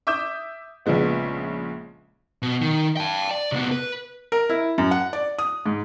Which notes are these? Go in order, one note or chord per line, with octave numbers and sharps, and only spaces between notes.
E5 D6 D#6 G6 E7
A#1 C#3 F3 G#3 B3
B2
D#3
G5 A5
D5
C3 B3
B4
A#4
E4
F#2
F#5
D5
D#6
G#2